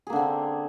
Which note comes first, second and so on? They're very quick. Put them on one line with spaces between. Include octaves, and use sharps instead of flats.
G#4 A#3 D3 C4